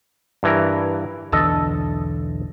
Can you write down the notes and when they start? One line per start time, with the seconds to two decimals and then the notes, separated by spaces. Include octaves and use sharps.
0.43 G2 E3 A#4
1.32 B1 E2 D3 A4 D#5 A5